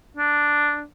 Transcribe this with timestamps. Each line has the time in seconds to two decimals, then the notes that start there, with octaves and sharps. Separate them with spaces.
0.17 D4